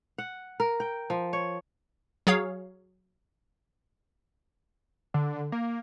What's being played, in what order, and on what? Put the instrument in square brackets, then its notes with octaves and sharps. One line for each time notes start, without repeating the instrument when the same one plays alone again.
[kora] F#5
A#4
G5
F3
C#5
[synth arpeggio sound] F#3 G#4 C#5 F5
[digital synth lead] D3
A#3